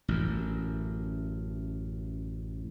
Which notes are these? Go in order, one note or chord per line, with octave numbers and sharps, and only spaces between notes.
A1 F#2